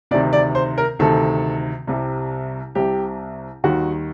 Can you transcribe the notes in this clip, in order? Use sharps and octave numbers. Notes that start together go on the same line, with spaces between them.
D2 C3 D#3 D5
D5
C5
A#4
D2 C3 D#3 A4
C2 C3 G3
C2 C3 G3 G4
D#2 D#3 G3 F#4